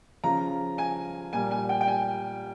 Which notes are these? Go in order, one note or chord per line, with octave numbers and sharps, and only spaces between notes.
C#3 F3 A#5
G#5
A#2 G3 G#5
G#5
G5
G5
G#5